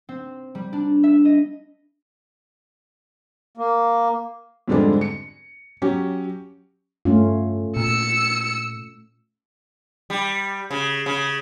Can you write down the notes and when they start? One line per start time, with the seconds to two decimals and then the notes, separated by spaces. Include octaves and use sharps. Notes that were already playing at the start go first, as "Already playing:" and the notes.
0.09 C4
0.55 G3
0.73 D4
1.03 E5
1.25 D#5
3.57 A#3
4.68 F2 G#2 D3 G3 G#3 D4
5.01 C#7
5.82 F#3 C#4 G4
7.05 G2 A3 C#4 F4
7.77 A#2 E6 C#7
10.10 G3
10.71 C#3
11.06 C#3